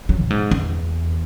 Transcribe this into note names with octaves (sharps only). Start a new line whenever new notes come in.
F#3
A2
G#2
E2